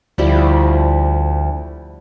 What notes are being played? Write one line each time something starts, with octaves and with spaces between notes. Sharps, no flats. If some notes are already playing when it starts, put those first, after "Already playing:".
D2 F3 G3 E4